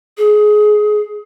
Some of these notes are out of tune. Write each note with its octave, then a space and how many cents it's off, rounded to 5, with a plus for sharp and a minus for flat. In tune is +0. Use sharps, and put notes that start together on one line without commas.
G#4 +20